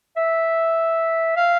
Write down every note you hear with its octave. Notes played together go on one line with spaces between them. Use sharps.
E5
F5